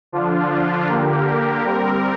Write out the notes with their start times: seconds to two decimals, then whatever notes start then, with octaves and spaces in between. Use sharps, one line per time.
0.12 D3 F3 D4 F4
0.88 D3 A#3 G4 A#4
1.64 G3 C4 A#4